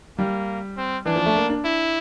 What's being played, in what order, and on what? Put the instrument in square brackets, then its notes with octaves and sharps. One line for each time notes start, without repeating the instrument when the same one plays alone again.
[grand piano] G3 [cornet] A#3
[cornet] C4
[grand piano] E3 [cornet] D4
[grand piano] F3
A3
A#3
D4
[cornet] E4